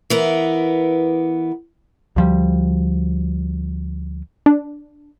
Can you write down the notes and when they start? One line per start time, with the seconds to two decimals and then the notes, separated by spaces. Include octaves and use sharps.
0.10 E3 B3 A#4
2.16 D2 F3 G3
4.46 D4